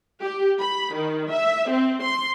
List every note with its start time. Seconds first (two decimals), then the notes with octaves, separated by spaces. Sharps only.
0.21 G4
0.60 B5
0.95 D#3
1.32 E5
1.70 C4
2.02 C6